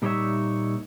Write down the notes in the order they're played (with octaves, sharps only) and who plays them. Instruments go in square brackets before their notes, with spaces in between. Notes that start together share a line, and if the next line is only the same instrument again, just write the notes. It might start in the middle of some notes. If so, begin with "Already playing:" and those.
[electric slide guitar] A#2 G3 D#4 G4 C#5 E5